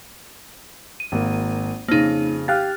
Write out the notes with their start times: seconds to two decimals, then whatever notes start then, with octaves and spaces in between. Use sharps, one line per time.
1.00 D#7
1.12 G#1 A#3
1.88 F2 C#3 A#3 D#4
2.48 G4 F5 F6 F#6 A6